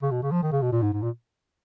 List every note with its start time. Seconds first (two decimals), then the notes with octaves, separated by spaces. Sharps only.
0.02 C#3
0.11 B2
0.22 C#3
0.31 F3
0.43 D#3
0.52 C#3
0.62 B2
0.72 A#2
0.82 G#2
0.93 G#2
1.02 A#2